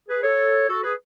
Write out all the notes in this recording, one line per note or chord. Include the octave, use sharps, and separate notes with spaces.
G#4 B4
A4 C#5
F#4 A4
G#4 B4